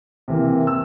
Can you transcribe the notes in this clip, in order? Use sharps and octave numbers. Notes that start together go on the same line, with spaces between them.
C3 E3 A#3
E6